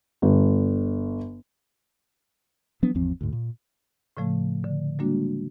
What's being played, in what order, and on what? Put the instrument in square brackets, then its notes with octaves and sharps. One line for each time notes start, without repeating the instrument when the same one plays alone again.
[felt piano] G1
[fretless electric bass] F3 F#3 B3 D4
G#1 E2 F3 C4
D2 G#2
A#2
[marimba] A2 C#3 F3 A3
D3
G3 G#3 A#3 D4 F#4